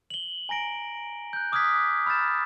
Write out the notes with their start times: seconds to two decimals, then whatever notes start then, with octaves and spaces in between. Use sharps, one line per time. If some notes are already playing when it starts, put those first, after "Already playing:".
0.10 F#7 G7
0.49 G#5 A#5 A#6 D7
1.33 F#6 G6
1.52 D6 D#6 F6 F#6 G#6 B6
2.07 B5 E6 F6 G6 A6 E7